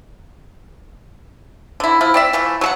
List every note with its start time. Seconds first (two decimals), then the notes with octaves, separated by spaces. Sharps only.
1.80 D3 E4
2.01 F3 E4
2.14 C4 D5 E5
2.33 E3 F3 A3
2.61 F#3 A4 F#5